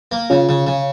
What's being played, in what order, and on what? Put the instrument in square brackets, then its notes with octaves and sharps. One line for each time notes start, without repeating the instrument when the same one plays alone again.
[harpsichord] A#3
[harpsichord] C#3 [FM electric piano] C#4 F4
[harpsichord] C#3
C#3